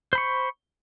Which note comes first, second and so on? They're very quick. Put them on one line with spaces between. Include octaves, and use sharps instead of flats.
C5 B5 C#6